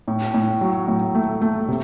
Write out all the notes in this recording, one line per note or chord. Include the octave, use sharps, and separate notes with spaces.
A2
A2
F#3
A2
A3
A3
C3